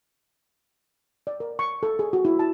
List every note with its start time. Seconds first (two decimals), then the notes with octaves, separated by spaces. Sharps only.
1.27 D5
1.40 A#4
1.59 C#6
1.83 A4
1.99 G#4
2.13 F#4
2.25 E4
2.39 A5